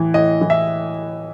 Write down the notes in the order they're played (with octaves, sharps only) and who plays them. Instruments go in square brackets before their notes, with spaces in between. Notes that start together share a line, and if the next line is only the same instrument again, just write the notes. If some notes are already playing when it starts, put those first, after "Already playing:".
Already playing: [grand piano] A2 E3
A2 D#5
E3
E5